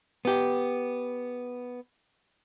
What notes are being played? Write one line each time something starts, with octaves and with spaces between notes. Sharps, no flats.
B3 G4